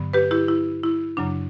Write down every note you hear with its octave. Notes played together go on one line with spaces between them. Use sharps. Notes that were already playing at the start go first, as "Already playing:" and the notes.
Already playing: G2 D3 F#3 B3
G4 B4
E4 G4
E4
E4
F#2 C#3 F#3 D4